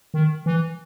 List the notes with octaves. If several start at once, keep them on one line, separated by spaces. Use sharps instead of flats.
D#3
E3